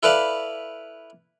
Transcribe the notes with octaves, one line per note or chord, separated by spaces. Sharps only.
E4 A4 B4 D5 F5